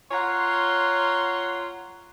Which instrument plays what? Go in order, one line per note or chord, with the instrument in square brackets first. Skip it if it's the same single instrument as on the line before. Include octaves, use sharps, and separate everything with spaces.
[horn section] F4 C#5 F#5 A#5 C6